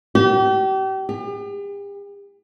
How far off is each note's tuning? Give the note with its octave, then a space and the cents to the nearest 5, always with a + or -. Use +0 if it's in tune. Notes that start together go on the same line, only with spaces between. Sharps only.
G4 -35
G4 +45